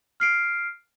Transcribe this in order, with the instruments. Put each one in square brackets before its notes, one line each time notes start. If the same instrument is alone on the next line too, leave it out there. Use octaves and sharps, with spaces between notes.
[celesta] F6 C7 D7